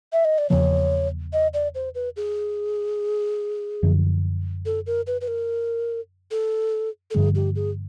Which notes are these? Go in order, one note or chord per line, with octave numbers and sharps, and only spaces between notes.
E5
D#5
D5
E2 C#3 F3 A#3 C#5
D#5
D5
C5
B4
G#4
F#2 D3 F3
A4
A#4
B4
B4
A#4
A4
A4
G2 D3 F3 A3 G#4
G4
G#4